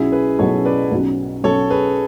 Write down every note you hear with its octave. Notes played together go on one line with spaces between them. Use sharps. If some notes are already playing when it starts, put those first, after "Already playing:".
Already playing: B1 B2 F#3 C#4 E4 G#4
G#4 B4
B1 B2 F#3 C#4 A4 C#5
B4 D5
B1 B2 F#3 C#4
B1 B2 F#3 C#4 A4 C#5
G#4 B4